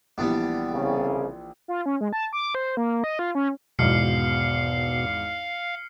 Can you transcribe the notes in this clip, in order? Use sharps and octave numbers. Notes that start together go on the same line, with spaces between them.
A#1 E3 G3 B3 D4
C2 C#3
F4
C#4
G#3
A5
D6
C5
A#3
D#5
F4
C#4
G#1 E2 B2 F5 F6 C7 C#7